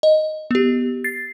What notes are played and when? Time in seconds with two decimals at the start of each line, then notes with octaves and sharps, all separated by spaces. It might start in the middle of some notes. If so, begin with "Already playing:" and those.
0.03 D#5
0.51 B3 G4
1.04 A6 C7